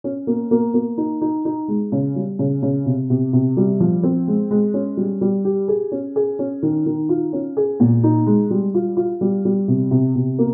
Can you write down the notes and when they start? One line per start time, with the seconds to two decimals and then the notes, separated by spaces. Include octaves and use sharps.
0.04 C#4
0.27 A#3
0.51 A#3
0.74 A#3
0.98 D#4
1.21 D#4
1.45 D#4
1.68 G#3
1.92 C#3
2.16 G3
2.39 C#3
2.62 C#3
2.86 C3
3.10 C3
3.33 C3
3.57 G3
3.80 F3
4.03 C4
4.28 G#3
4.51 G#3
4.74 C#4
4.97 G3
5.21 G3
5.45 G4
5.68 G#4
5.92 C#4
6.16 G#4
6.39 C#4
6.63 D#3
6.86 D#3
7.09 F4
7.33 C#4
7.57 G#4
7.80 A#2
8.04 D#4
8.26 G#3
8.50 G3
8.74 F4
8.97 F4
9.21 G3
9.45 G3
9.68 C3
9.91 C3
10.15 C3
10.39 A#3